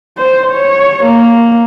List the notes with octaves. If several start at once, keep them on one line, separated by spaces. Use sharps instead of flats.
C5
C#5
A#3